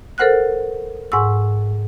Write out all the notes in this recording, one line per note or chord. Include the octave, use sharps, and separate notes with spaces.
A4 A#4 C5 F#5 F6 F#6
G#2 F#5 G#5 C#6 E6